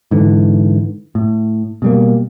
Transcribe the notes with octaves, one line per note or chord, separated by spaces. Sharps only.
G#2 D3 E3
A2
B2 G3 A#3